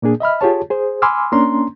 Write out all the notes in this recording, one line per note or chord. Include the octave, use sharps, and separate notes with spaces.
A#2 A#3 D4 G#4
D#5 E5 B5 F6
F4 G4 G#4 C#5 A5
G#4 C5
G#5 B5 C6 D6 E6 F6
A#3 C#4 D4 A#5 C6